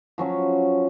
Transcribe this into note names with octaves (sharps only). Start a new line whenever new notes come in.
F3 F#3 C#4